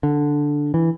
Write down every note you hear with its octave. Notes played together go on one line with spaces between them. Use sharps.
D3
E3